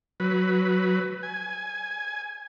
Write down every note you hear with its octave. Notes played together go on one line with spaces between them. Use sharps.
F#3 B4
G#5